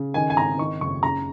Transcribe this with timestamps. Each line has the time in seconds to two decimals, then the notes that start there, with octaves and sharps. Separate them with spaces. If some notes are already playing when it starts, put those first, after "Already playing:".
Already playing: C#3
0.14 D#3 G#5
0.30 G#5
0.37 G#1 A#5
0.58 D#3 C#6
0.81 F#1 C#6
1.03 C#3 A#5